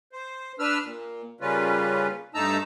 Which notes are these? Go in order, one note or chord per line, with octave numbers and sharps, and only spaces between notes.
C5
D4 B4 E6 F6
A#2
C#3 G3 A#3 C#4 F4 B4
G2 A3 D#4 A5 A#5 E6